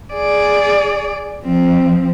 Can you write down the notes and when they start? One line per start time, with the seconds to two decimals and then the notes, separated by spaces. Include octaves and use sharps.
0.13 G#4 D5
1.44 F3 C4